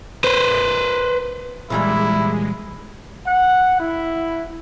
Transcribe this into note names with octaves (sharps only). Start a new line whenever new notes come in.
B4 C5
A#2 E3 G3 G#3 E4
F#5
E4